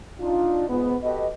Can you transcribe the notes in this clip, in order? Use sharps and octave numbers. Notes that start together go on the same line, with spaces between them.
D4 D#4 F4
G#2 B3
F#4 G4 A4 B4 D#5